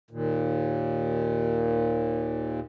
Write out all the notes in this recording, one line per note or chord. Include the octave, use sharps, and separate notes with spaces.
D#2 A#2